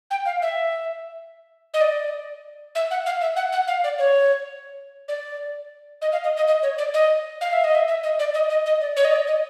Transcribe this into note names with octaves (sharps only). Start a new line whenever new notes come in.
G5
F5
E5
D#5
D5
E5
F#5
F5
E5
F#5
F#5
F5
D5
C#5
D5
D#5
F5
D#5
D#5
D#5
C#5
D5
D#5
F5
E5
D#5
E5
E5
D#5
D5
D#5
D#5
D#5
D5
C#5
D#5
D5
D#5